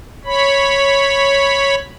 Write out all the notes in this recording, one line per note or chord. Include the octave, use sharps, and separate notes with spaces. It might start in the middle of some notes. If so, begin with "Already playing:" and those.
C#5 B5